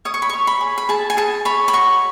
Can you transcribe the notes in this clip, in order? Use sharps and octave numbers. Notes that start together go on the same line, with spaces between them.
C#5 D#6
C#6
B5
C#5 C#6
B5
G#4
B5
G#4 A5
G#5
G#4 A5
C#5 B5
B5
F#4 C#6